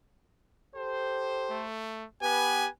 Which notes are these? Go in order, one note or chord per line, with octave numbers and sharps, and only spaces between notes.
G4 A4 C5
A3
B3 G4 B4 G#5